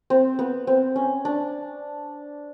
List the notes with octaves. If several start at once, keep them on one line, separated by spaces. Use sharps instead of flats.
C4
B3
C4
C#4
D4